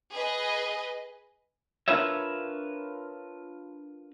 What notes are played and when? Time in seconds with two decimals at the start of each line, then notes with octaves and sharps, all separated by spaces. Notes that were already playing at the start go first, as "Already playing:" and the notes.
0.13 G#4 B4 D#5
1.88 D4 F4 A#4 B4 C#5 E5